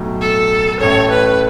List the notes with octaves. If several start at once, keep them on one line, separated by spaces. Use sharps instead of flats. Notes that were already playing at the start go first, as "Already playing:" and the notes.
Already playing: B1 A2 F#3
A4
A1 A2 A3 C#4 C#5
B4